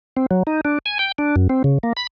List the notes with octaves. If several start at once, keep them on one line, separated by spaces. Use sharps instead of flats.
C4
F#3
D#4
D4
G#5
G5
D4
F#2
C4
C#3
A#3
B5